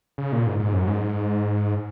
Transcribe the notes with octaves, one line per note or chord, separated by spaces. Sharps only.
C#3
A#2
G#2
G#2
F#2
G#2